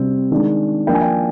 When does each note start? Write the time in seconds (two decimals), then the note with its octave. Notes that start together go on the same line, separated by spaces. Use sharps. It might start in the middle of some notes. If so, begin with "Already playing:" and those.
Already playing: C3 G3 C4
0.31 D#3 G#3 D4
0.87 F3 A#3 D4 G5
0.95 G#5
1.01 G5